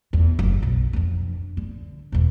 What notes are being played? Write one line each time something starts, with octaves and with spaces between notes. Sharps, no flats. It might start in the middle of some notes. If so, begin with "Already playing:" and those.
E2
F#1
B1
F2 D4
D3
E2 B2